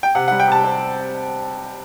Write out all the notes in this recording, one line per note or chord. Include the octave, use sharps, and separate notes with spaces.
G5
C3 F#5
G3 F#5
G5
C3 A5
C4